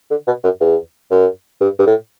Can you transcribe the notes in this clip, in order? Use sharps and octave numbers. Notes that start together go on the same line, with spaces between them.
D3
B2
F#2
E2
F#2
G2
G2
A2